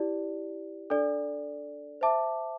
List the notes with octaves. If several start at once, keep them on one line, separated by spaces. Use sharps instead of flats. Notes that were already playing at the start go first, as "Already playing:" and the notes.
Already playing: E4 G4 D5
D4 A4 D5
C5 E5 A5 D6